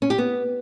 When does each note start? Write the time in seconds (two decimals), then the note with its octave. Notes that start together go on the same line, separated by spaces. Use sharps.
0.02 C#4
0.10 G4
0.18 B3